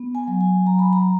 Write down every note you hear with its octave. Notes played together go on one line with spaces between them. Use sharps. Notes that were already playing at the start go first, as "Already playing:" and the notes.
Already playing: B3
G#5
F#3
G#5
F#3 A#5
B5
A#5